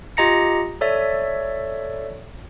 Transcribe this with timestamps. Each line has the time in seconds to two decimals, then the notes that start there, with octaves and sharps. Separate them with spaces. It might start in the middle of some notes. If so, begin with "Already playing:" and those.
0.17 F4 G4 D#5 A#5 A#6 C#7
0.81 A4 C#5 D5 E5